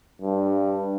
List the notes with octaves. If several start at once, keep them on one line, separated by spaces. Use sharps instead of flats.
G2